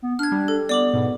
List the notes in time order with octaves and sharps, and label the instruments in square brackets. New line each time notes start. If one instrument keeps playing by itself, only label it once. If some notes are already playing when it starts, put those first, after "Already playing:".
[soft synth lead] B3
[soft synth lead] D4 [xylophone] F6 G#6
[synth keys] G3
[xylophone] A4
[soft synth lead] B3 [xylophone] D5 D6 F#7
[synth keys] G#2 B2